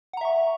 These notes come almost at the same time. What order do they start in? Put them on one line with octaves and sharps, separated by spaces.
F#5 A#5 E5 C#6